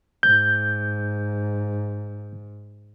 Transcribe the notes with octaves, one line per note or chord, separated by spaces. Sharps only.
G#2 G6